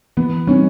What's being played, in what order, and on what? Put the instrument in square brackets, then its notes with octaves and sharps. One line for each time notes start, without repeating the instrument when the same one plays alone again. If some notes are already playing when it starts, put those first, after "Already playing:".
[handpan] E3 [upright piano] B3
[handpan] G3 C4 D#4 [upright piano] C#4